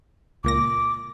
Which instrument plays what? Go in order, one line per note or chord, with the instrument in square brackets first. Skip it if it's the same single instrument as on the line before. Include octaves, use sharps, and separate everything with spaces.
[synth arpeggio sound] C#2 A#2 A#6 [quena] D6